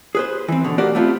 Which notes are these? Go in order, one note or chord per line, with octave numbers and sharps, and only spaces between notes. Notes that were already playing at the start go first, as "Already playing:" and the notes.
G#4 B4 C5
E3 C4
B2 D3
A3 A#3 F#4 G4 D5
A3 B3 C4 F4